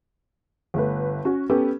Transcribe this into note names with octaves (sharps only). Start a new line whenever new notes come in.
G1 A3 B4
C#4 F#4
B3 C#4 G4 A4